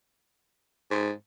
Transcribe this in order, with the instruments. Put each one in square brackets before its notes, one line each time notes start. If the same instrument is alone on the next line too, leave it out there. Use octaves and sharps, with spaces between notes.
[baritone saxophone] G#2